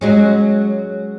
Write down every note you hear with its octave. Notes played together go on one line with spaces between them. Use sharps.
F#3 G#3 C#4